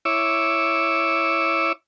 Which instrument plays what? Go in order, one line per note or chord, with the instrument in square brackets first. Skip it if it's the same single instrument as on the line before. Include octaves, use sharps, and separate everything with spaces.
[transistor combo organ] E4 C#5 D6 E6